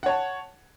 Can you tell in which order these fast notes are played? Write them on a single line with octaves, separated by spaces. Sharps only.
F#5 C#5 A5